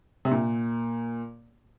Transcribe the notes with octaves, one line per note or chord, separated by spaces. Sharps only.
C3
A#2